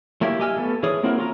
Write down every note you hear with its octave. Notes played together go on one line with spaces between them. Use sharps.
F#3 A3 A#3 E4 G4
G4 D#5 G#5 E6 F6
A3 B3 A4
E3 G#4 C#5 D#6
A#3 C4 E4 F#4 A#4
C#4 F4 A4 A#4 A#5